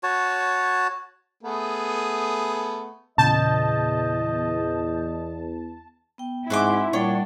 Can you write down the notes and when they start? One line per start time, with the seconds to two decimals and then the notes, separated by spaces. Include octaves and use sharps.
0.03 F#4 C#5 A5
1.43 A3 B3 G#4
3.18 E2 A#2 C#3 D#5 A5 G6
6.18 B3 G5
6.50 G#2 C4 E4 F#4 F#5 G#5 C6 D6
6.93 A#2 G3 D4 C#5 F#5 G5